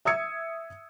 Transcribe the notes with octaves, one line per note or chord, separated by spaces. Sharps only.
E5 D#6 E6 G#6 C#7